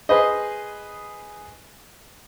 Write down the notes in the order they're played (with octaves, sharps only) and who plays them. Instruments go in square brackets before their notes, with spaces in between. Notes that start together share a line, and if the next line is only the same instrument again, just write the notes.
[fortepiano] G#4 B4 C5 D#5